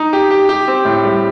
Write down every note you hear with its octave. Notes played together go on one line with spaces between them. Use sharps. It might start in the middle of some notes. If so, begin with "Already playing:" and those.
Already playing: D#4
G4
G4
G4
C4
A2
G3